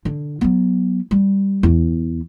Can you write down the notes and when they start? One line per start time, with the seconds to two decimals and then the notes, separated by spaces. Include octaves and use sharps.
0.05 D3
0.41 F#3 B3
1.11 G3
1.63 E2